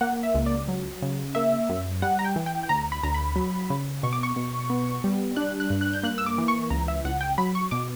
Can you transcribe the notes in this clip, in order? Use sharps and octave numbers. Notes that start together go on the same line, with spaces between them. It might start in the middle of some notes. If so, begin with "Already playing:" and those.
A#3 F#5
E5
C#2
D5
F#3
C#3
A#3 E5
F#2
G3 F#5
A#5
G5
E3
G5
G5
D2 A#5
B5
D2 A#5
B5
F#3
C#3
B2 C#6
D6
C#6
B2
B3
G3
D4 F#6
F#6
G2
F#6
G6
A#3 F#6
E6
D6
E3
C#6
C#2 A#5
E5
C#2 F#5
G5
F#3 B5
C#6
B2 D6